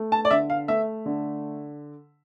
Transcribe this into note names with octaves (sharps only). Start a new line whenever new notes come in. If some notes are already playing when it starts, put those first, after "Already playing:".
Already playing: A3
A5
D5
D3 E5
F5
A3 E5
D3